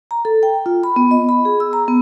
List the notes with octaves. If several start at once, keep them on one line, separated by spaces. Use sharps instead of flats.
A#5
A4
G5
F4
B5
B3
D#5
B5
G#4
E6
A#5
B3